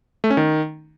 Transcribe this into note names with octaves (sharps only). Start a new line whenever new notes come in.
A3
C#4
D#3